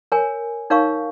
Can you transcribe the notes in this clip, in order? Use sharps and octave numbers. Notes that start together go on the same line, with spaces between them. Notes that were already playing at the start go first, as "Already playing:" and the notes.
A#4 C#5 G#5
D#4 A#4 C#5 F5 C#6